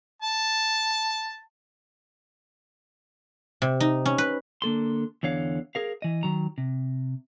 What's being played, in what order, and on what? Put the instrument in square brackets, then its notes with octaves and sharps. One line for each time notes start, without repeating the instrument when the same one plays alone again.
[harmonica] A5
[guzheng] C3
D#4
C#4
B4
[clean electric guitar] D3 A#3 A4 C6
E2 D3 C#5 F5
G#4 A#4 F5
E3 D#5
D#3 F#3 A#5
C3